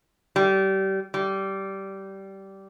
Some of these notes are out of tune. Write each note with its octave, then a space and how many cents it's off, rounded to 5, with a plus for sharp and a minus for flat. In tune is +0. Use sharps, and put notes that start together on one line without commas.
G3 -25
G3 -15